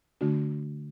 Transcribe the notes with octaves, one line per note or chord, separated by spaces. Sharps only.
D3 A3 D4 F#4